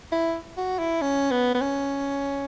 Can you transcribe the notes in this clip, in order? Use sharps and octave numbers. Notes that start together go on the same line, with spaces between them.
E4
F#4
E4
C#4
B3
B3
C#4